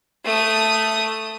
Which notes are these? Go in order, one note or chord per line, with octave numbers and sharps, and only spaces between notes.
A3 D#6